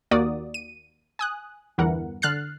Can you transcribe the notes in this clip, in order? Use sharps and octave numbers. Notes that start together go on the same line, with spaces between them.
D#2 A#3 F#4 D5 D#6
D#7
G#5 D#6 F#6
G1 E2 E3 A#4 F#5
D3 F6 F#6 A6 C7